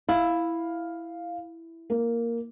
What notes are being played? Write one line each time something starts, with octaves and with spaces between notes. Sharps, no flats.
E4 F5
A#3